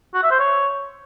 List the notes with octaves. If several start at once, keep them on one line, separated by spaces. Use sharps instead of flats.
F#4
E5
C5
C#5